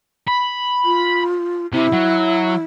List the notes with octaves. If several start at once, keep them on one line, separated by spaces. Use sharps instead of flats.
B5
F4
C3 E4
F#3